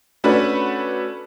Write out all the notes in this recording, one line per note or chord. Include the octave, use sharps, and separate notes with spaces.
A3 C#4 D4 F#4 B4